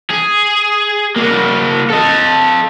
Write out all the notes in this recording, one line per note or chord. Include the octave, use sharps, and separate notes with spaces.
G#4
A#3 F#4
A4 D#5